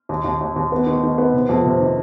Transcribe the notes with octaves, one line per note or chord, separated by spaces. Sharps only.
D#2
D#2
D#2
D#2
B3
D#3
D#3
B3
C3
F2
C3
D#3